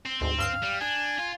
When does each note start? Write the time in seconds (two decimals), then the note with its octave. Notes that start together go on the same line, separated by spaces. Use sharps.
0.06 C4
0.21 D2 G#2 C4
0.39 G2 F5 E6 C7
0.63 G3
0.81 D4 G#5
1.18 F4